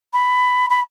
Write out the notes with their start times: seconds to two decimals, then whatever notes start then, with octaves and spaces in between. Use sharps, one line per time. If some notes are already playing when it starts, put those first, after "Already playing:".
0.13 B5
0.70 B5